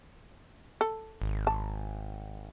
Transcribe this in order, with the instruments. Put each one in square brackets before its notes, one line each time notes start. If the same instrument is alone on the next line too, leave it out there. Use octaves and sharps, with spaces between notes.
[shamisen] A4
[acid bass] G#1
[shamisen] A5